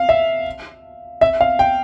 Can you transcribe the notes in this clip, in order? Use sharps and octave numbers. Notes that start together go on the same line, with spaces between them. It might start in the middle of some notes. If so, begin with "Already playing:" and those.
Already playing: F5
E5
E5
F5
G5